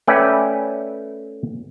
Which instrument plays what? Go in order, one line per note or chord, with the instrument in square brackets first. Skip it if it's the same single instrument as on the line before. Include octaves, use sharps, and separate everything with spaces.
[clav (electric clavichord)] A3 C#4 B4 D5 E5 G5